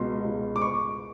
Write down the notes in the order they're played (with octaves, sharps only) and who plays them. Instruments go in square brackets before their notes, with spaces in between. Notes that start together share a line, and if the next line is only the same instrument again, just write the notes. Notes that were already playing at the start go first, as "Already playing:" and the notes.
Already playing: [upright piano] C#2 B2 C6
C#2 B2
D6
C#6